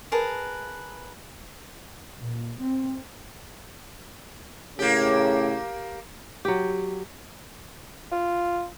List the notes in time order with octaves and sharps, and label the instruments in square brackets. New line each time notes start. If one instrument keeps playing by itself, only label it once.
[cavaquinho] G#4 A#4 B4 A5
[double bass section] A#2
C4
[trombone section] A2 C#3 [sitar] A#3 G4
[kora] F#3 G4
[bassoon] F4